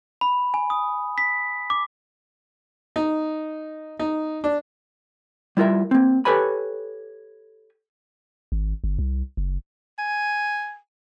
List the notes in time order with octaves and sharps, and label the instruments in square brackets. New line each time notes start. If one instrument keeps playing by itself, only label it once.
[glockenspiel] B5
G#5
D#6
B6
D6
[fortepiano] D#4
D#4
D4
[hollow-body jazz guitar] G3 E4 F4 A#4 E5
A#3 C4
G4 A4 B4 C#5 G#5 B5
[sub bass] G#1
G1
C2
F#1
[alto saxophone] G#5